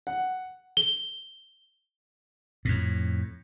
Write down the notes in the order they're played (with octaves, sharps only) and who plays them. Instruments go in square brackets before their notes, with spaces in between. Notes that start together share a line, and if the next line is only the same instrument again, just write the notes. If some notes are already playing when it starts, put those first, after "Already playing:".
[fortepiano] F#5
[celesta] G7
[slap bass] F2 A2